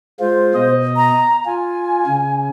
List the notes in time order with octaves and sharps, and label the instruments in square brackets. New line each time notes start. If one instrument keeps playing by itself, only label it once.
[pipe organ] G#3 F4 [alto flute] C5
[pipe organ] B2 D#5
[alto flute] A#5
[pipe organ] F4 [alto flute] G#5
[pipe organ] C#3